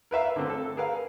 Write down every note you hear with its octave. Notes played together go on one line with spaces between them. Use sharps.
A#4 B4 E5 F5
D3 A3 C4
A4
G#4 A#4 B4 F5